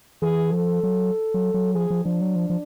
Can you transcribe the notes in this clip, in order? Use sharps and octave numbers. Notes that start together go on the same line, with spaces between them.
E3 G#4
F3 A4
F#3
F#3
F#3
F3 G#4
F3
F3 D4
F#3
F3
F3